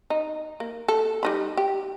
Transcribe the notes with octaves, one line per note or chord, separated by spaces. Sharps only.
D#4
A#3
A4
G3 D#4 B5
G4